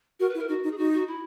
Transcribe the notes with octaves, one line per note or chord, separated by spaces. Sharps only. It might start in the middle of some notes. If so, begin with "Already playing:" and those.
F#4 A#4
B4
E4
A#4
D#4 F#4
D#4
G#4
D#4 F#4
F#4
E4